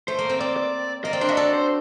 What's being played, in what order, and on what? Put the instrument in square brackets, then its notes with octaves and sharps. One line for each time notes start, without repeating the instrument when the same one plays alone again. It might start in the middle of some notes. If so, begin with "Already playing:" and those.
[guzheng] A3 [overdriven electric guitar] C5
[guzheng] A#3
C4
[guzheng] C4 [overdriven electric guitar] D5
[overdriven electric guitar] D5
[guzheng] A#3 [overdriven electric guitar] D#5
[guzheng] C4 [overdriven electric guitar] D5
[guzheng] D4 [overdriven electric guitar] C5
[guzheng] F#4 [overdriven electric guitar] D#5
[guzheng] A4 [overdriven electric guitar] D5
[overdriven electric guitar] C5